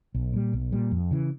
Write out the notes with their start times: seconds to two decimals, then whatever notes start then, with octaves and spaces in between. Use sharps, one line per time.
0.14 B1
0.33 A#2 G3
0.53 B1
0.72 A#2 G3
0.91 F2
1.11 C#3 E3